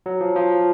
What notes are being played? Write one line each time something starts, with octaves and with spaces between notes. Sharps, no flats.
F#3
F3
F3